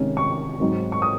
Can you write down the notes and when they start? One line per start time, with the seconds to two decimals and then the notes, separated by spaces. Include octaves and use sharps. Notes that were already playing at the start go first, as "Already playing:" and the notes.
Already playing: C3 D#3 G#3 C#4
0.17 C#6
0.60 G#2 F#3 C4
0.92 C#6
1.02 D#6